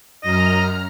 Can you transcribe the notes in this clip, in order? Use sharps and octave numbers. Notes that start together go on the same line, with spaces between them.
F#2 D#5 A#5 F6